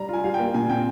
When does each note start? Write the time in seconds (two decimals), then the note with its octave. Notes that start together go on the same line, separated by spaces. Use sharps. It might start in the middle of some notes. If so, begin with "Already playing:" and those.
Already playing: G3 A#5
0.08 F4 G#5
0.24 G3 F5
0.34 A#3 G5
0.54 A#2 G#5
0.69 C4 G5